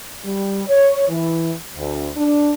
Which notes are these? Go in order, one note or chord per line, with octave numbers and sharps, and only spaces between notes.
G3
C#5
E3
D2
D4